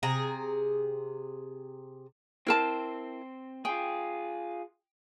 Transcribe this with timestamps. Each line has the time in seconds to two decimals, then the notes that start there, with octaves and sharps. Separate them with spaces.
0.03 C3 G#4 A#5
2.47 C4 E4 A#4 C5 A5
3.65 F4 G#4 G5